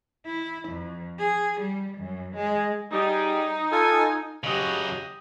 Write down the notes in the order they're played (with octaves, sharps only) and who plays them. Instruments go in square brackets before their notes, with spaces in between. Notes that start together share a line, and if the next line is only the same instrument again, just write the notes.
[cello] E4
F2
G#4
G3
F#2
G#3
[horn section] G3 G4 G#4 [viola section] D#4
[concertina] F4 A4 [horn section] G#5
[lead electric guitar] C#3 F#3 [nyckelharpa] G4 D#5